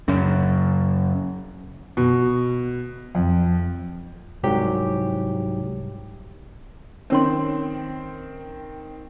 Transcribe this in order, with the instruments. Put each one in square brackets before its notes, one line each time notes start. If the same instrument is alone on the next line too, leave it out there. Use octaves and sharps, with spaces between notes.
[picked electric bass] F#2 C#3
[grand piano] B2
F2
[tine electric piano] C2 G#2 F#3 G4
[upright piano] D#3 C4 [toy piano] C#4 C#5 C6